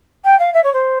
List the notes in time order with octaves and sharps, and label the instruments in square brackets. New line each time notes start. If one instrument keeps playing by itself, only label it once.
[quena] G5
F5
E5
C#5
C5